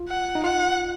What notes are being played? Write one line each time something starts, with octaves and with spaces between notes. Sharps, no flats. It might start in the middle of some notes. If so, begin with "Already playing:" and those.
Already playing: F4
F#5
D#4
F4 F#5